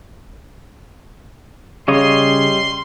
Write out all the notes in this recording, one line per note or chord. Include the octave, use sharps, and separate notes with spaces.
C#3 G3 C#5 D#5 C6